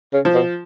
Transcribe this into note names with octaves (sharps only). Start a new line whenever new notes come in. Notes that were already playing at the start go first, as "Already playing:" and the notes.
C#3
F3
B2